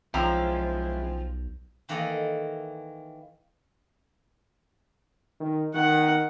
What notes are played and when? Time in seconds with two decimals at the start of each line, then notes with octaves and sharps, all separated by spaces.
0.14 B1 F3 G#3 C#4 E4 G5 A#5 E6
1.89 D#3 E3 A#3 A4 D#5
5.40 D#3
5.75 D#3 F#5